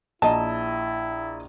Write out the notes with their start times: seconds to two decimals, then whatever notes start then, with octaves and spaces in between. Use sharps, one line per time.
0.22 A#1 E4 D#5 A5 A#5